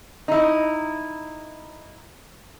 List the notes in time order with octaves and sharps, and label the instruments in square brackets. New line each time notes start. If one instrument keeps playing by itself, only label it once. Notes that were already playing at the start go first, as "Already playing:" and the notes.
[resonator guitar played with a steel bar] D#4 E4